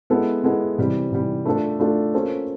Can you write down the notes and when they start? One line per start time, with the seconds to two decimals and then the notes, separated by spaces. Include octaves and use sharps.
0.10 G#3 B3 E4 A4
0.44 G#3 B3 E4 A4
0.78 C3 E3 G3
1.12 C3 E3 G3
1.46 A3 D4 F4 A4
1.80 A3 D4 F4 A4
2.14 A#3 C#4 F4 A4 C5